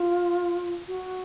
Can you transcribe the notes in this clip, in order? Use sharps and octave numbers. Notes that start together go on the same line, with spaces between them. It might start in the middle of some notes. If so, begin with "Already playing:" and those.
Already playing: F4
F#4